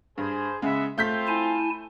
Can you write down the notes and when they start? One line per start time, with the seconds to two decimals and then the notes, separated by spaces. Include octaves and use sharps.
0.18 G2 G#4 C5
0.62 C#3 G#3 B3 E5
0.98 A3 C4 F4 G6 B6
1.28 E4 G#5 A5